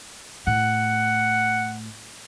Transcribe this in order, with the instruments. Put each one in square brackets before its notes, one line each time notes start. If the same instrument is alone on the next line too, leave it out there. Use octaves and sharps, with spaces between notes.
[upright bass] A2 [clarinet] F#5